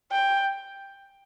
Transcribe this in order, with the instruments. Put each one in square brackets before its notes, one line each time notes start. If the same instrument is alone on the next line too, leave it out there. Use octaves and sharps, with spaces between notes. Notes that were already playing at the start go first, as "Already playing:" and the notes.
[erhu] G5